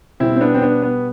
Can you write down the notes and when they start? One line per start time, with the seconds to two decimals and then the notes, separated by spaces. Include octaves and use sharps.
0.20 B2 G3 C4 E4
0.36 C4
0.41 B3 D4
0.54 C4
0.62 B3 D4
0.82 B3